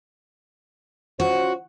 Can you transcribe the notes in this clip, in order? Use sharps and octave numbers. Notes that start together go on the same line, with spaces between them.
C#4 F4 F#4 C5